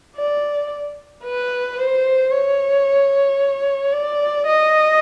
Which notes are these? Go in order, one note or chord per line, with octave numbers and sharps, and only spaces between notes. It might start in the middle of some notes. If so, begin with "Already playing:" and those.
D5
B4
C5
C#5
D5
D#5